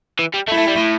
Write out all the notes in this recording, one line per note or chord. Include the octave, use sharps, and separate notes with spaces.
E3
G3
A3 E4
A3
G3
A2